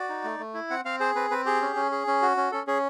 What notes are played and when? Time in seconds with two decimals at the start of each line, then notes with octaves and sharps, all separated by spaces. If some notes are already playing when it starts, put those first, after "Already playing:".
Already playing: F#4 D5
0.09 D#4
0.24 A3
0.39 A3
0.54 E4
0.70 C4 F#5
0.85 C4 F5
1.00 G#4 C5
1.15 C4 B4
1.31 C4 B4
1.46 G4 G#4
1.61 C#4
1.76 C#4
1.91 G#4
2.07 C#4
2.22 F#4
2.37 C#4
2.52 C#4 A4
2.67 C#4 G#4